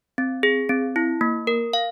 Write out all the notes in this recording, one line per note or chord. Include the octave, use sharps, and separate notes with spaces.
C4
G#4
C4
E4
A#3
A#4
F5